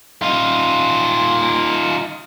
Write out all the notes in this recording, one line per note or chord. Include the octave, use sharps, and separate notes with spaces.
D#4 F4